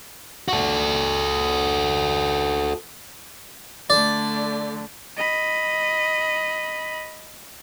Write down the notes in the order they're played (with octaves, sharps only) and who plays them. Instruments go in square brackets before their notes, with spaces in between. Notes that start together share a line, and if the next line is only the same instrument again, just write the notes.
[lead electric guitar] F#4 A4
[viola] D3 A3 [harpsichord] D5
[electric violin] D#5 B5